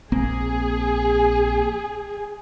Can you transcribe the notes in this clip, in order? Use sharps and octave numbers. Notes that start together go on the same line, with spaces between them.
A#1 A#3 C4 G#4